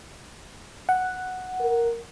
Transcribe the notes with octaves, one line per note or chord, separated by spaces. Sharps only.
F#5
A#4